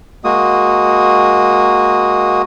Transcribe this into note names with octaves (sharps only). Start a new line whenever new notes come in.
G#3 A#3 F#4 D#6